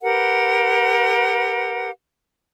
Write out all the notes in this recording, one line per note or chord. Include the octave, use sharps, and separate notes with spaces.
G4 A#4 B4 F#5